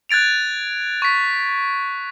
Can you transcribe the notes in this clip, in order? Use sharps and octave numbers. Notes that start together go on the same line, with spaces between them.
F#6 G#6 A6 D7 F7
C#6 B6